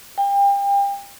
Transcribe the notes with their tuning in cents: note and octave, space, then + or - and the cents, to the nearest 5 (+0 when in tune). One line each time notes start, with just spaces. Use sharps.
G5 +35